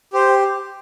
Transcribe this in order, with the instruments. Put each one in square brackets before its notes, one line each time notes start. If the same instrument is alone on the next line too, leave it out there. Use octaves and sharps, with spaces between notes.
[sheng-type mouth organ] G4 C5